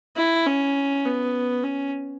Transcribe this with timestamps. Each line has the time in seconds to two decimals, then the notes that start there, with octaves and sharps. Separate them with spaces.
0.17 E4
0.46 C#4
1.05 B3
1.64 C#4